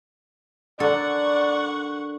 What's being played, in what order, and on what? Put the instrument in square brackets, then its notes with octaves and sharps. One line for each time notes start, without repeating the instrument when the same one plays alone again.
[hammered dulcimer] D3 A#4 [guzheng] A4 [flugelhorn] D5 [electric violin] F#5 C#6